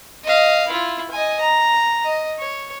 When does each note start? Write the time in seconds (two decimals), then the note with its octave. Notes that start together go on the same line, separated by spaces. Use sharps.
0.24 D#5 F5
0.68 E4 F4
1.11 D#5 G#5
1.41 A#5
2.05 D#5
2.39 C#5